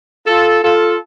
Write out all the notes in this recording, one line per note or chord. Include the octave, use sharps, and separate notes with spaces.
F4 A4
F4 A4